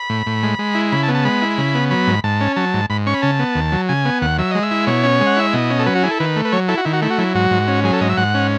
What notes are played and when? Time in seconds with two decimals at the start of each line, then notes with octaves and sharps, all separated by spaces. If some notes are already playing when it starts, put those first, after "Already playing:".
Already playing: B5
0.10 A2
0.26 A2
0.43 G#3
0.59 G#3
0.75 E4
0.92 C#3 B5
1.03 A5
1.08 B3
1.14 A5
1.25 G#3 B5
1.42 E4
1.58 C#3
1.75 B3
1.91 F#3 B5
2.07 G#2
2.24 G#2 A5
2.41 C#4
2.56 F#3 A5
2.74 G#2
2.90 G#2 B5
3.07 C#4 C#6
3.14 B5
3.22 C#3 A5
3.39 B3
3.55 D#2
3.72 F#3
3.89 C#3 G#5
4.05 B3
4.21 D#2 F#5
4.38 F#3 E5
4.51 G#3 D#5
4.63 E5
4.71 E4
4.87 B2 C#5
5.03 C#4
5.21 G#3
5.26 F#5
5.37 E4 E5
5.53 B2 D#5
5.70 C#4
5.79 A4
5.86 F#3 B4
5.95 F#4
6.03 E4 G#4
6.11 A4
6.20 D#3 B4
6.36 A3
6.45 B4
6.52 F#3 C#5
6.68 E4 A4
6.78 F#4
6.85 D#3 E4
6.93 F#4
7.02 A3 E4
7.10 F#4
7.18 F#3 E4
7.35 G#2 F#4
7.51 G#2
7.68 C#4
7.84 F#3 G#4
7.93 A4
8.01 G#2 D#5
8.09 E5
8.17 G#2 F#5
8.34 C#4